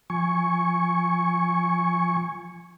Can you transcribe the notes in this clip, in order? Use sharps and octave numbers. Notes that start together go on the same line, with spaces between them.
F3 G#5 C#6